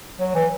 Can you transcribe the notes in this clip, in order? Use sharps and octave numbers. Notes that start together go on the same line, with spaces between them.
F#3
E3